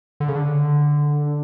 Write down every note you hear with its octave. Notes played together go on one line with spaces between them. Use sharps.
D3
C#3
D3